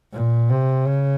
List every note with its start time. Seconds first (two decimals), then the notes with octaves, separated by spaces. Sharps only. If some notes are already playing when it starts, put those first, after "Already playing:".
0.12 A#2
0.50 C3
0.87 C#3